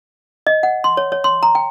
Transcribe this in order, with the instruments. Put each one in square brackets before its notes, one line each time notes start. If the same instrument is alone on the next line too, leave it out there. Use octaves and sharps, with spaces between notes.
[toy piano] D#5
F#5
C6
C#5
C#5
C6
A#5
G5